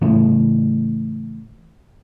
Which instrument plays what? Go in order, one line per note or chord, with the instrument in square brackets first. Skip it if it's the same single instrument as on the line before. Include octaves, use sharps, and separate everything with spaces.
[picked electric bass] A2 C#3 E3 A3